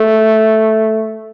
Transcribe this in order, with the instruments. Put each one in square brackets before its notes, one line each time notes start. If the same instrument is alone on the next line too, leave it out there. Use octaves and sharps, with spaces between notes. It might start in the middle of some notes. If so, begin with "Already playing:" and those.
Already playing: [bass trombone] A3